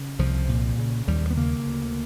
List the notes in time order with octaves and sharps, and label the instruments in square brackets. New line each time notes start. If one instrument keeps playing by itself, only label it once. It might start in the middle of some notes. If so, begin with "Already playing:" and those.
Already playing: [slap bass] C#3
C2 F3
A#2
C#3
D#2 G3
B3
C#3 A#3
D2